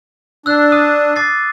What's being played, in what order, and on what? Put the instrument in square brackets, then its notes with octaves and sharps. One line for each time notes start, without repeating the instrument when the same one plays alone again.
[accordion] D4 [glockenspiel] E6 F#6
[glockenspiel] D#6 D#7
D6 A6 C7